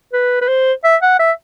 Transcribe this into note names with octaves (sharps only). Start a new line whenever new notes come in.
B4
B4
C5
E5
F#5
E5